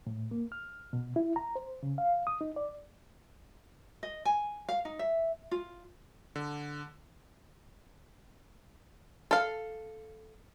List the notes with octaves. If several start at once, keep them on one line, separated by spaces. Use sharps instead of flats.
A2
A#3
F6
B2
E4
A#5
C5
C#3
F5
D#6
D#4
D5
D#5
G#5
F5
D#4
E5
F4
D3
A4 F5